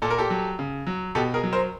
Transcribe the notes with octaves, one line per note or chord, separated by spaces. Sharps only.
A#2 A4
A#4
G4 A4
F#3
C#3
F#3
B2 G4 A4
G#4 A#4
F#3
A#4 C5